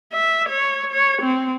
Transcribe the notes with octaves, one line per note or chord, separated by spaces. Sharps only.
E5
C#5
C#5
C4